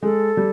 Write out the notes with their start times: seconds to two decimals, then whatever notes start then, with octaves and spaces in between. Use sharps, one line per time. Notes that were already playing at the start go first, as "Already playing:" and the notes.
0.02 G#3 A4
0.37 G3